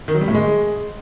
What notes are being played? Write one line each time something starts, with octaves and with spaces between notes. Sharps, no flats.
D#3
F#3
G3
A2
G#3